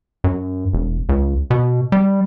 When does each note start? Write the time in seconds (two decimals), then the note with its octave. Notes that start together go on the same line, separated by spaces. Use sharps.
0.24 F#2
0.73 E1
1.09 C#2
1.50 B2
1.92 G3